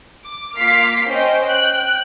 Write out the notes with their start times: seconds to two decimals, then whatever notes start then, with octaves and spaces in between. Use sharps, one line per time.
0.23 D6
0.56 A#3 F4 D6 F6 B6 C7
1.06 C#4 C5 D#5 G5
1.44 G5 F#6